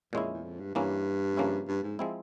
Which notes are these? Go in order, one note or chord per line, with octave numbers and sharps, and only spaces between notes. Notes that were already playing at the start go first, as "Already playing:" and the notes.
E2 A#2 G#3 C#4 E4
F2
E2
F2
G2
G2 E3 A#3 C#4 E4
C#3 F3 A#3 C#4 E4
G2
G#2
F3 G#3 C4 E4